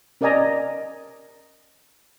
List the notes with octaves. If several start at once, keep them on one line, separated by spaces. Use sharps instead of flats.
C#4 A#4 D5 D#5 G#5 A#5